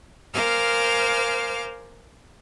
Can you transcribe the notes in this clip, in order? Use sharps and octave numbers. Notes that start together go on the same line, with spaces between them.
A#4 C5 F5 G#5 D6 F6